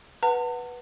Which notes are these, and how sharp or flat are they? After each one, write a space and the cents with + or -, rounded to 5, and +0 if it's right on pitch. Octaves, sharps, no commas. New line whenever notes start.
B4 -10 F#5 +0 A5 +45